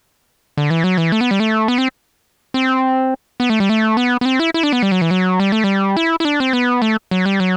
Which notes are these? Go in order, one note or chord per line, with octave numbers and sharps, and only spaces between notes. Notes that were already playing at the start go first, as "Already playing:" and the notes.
D3
E3
F#3
E3
A3
B3
G3
A3
B3
C4
C4
B3
A3
G3
A3
B3
B3
C4
E4
E4
D4
B3
G3
F#3
E3
F#3
G3
A3
G3
E4
E4
D4
C4
B3
A3
F#3
G3
F#3